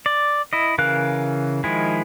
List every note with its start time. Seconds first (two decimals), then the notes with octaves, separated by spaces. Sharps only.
0.06 D5
0.53 E4 D#5
0.78 C#3 E3 A#4 F5 F#6
1.64 D#3 F3 G#3 E4